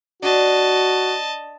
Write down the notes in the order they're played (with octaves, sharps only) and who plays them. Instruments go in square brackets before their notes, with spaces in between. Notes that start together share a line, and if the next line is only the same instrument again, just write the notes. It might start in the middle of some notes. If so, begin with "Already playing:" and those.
[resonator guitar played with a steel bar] D4 [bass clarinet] F#4 [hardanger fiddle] D#5 A5